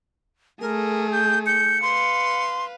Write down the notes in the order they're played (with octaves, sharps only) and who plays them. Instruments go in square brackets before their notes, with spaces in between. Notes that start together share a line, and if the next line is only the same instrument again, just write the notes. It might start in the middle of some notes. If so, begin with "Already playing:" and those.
[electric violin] A3 G#4 [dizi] A#4
[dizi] G6
[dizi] G6 [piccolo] C#7
[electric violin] B4 F5 [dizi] C6